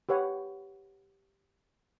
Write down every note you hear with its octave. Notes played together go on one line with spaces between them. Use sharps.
G4 B4 C#5 F#5